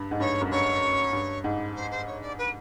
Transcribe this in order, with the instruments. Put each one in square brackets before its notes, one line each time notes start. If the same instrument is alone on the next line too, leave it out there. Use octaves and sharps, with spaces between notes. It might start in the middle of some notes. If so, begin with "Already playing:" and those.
Already playing: [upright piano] G2
G#2
[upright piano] G2 [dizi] C#5
[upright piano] F#2
[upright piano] G2 [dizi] C#5
[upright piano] G2
G#2
[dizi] C5
C5
C#5
D5
B4